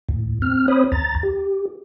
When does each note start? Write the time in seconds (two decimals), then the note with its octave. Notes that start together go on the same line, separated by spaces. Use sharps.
0.09 D#2 A2
0.42 C4 F6
0.68 C4 C5 C#5 B5 D#6
0.92 D#2 A#5 A6
1.23 G4